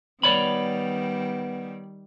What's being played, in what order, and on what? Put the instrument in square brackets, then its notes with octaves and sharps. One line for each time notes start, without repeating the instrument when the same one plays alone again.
[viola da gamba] D#3 G3 [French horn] B3 [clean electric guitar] C#5 D5 B5